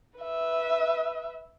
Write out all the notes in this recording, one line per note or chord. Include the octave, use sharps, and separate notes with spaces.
B4 E5